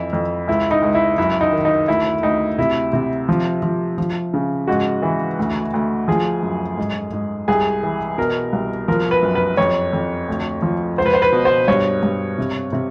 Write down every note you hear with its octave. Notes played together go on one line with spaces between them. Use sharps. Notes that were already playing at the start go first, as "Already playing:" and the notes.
Already playing: F2 E3 E4
F2
C#2 E4
D#4
C#2
E4
F#2 E4
D#4
D#3
D#4
D2 E4
D2 D#4
C3 E4
C3
F3
F3
F3
C#3
G#2 F#4
E3
D2
D2
F3 G#4
F#2
G#2
G#2
C2 G#4
E3
B2 A#4
C2
F3 A#4
B4
F#2
B4
F2 C#5
F2
D2
F3
C#2 C5
B4
C5
B4
B2
C5
G2 C#5
G2
C3
C3